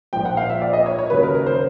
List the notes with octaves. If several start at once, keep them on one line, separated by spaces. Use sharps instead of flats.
A#1 A#2 F3 G5
F#5
F5
E5
D5
D#5
C#5
C#5
D#2 C#3 F#3 B4
A#4
A#4
C5